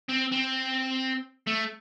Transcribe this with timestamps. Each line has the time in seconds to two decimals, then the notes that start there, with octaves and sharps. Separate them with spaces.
0.09 C4
0.32 C4
1.47 A3